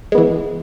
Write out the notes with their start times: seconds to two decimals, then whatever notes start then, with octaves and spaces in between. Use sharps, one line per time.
0.12 G#3
0.15 B3
0.18 E3